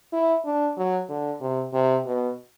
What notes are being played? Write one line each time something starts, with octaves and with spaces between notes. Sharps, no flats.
E4
D4
F#3
D3
C3
C3
B2